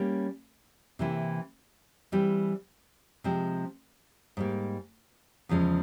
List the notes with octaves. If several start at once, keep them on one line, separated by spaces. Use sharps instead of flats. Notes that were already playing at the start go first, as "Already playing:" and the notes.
Already playing: G3 A#3 C#4
C3 E3 A#3 E4
E3 G3 C4
C3 F3 G#3 C4
G#2 G3 A#3
E2 C#3 F3 G#3